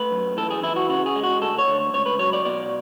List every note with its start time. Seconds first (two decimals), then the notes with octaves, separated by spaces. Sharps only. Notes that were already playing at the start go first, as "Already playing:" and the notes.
Already playing: A3 B4
0.11 F#2
0.37 E3 A4
0.50 G#4
0.63 E3 E4
0.76 F#4
0.89 C#3 F#4
1.06 G#4
1.16 G#3
1.23 F#4
1.42 D2 A4
1.58 C#5
1.68 D2
1.94 C#2 C#5
2.06 B4
2.19 F#3 C#5
2.33 D5
2.45 B2 D5